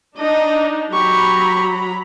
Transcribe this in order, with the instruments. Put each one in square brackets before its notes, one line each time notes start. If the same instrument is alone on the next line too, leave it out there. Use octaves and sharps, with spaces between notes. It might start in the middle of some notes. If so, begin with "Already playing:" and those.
[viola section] D4 D#4 [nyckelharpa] D#5
[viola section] F#3 A#5 B5 [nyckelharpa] G4 C#6